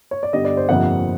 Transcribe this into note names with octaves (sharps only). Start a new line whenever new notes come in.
C#5
D5
G2 D3 G3 B3 D#5
D5
C5
G1 F2 C3 F3 A#3 F#5